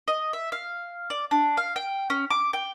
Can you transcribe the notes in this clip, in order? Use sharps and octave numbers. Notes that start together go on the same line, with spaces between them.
D#5
E5
F5
D5
D4
F5
G5
C#4
D6
G5